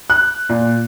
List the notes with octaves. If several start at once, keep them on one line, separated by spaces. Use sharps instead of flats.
F#6
A#2